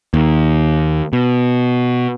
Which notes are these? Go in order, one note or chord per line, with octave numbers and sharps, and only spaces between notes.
D#2
B2